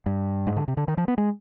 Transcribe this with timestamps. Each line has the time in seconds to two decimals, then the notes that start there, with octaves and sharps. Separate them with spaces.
0.06 G2
0.47 G#2
0.56 D3
0.68 C3
0.77 D3
0.88 D#3
0.97 F3
1.08 B3
1.18 G#3